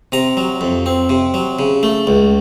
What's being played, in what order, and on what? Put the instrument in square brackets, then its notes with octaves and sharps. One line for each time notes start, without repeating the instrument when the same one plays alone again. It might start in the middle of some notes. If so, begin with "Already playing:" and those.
[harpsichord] C3 A#5
F#3
F2
C4
C3
F#3
C#3
A3
C#2